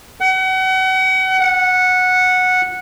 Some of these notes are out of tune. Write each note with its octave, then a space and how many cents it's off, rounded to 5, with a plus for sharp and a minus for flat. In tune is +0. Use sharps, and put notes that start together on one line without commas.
F#5 +35
F#5 -10